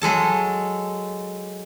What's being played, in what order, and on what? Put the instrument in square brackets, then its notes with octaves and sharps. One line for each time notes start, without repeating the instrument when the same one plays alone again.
[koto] F#3 G#3 A4 A5